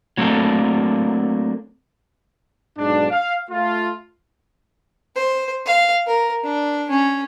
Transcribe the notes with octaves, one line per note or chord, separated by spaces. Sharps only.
F#3 A3 A#3 C4 D4 A4
B1 G#2 D4
F5
A3 F4
C5
F5
A#4
D4
C#4